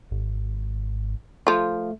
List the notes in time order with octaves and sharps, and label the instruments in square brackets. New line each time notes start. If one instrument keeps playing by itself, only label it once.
[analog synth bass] G#1
[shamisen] F3 F4 [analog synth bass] A3